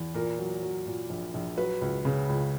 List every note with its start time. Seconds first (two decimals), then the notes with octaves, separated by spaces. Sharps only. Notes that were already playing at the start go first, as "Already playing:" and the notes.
Already playing: E2
0.14 A#2 A#4
0.39 F#3
0.63 F#3
0.86 A#2
1.10 A#1
1.34 A#1
1.57 F#3 B4
1.81 C#2
2.05 C#3
2.29 C#2